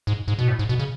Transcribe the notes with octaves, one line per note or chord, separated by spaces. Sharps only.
G#2
G#2
B2
A2
G#2
B2
C#3